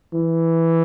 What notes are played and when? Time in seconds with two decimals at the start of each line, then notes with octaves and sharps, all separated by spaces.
0.14 E3